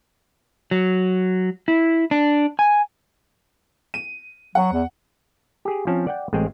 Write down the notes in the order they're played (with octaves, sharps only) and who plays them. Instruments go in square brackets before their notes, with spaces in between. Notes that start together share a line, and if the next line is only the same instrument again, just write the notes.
[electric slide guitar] F#3
E4
D4
G#5
[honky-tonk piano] D#7
[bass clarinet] F#3 [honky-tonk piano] F#5
[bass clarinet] E2
[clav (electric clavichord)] G4 G#4
F3 C4 C#4 A5
D5 F#5 G5
A1 G#3 C4 G#4 G5